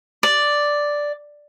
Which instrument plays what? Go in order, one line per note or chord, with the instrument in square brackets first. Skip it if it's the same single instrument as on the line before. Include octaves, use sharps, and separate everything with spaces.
[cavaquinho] D5